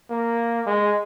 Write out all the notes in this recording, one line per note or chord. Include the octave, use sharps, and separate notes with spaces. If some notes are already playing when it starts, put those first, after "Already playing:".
A#3
G#3